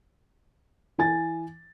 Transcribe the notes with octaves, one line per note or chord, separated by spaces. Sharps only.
E3 G#5 A6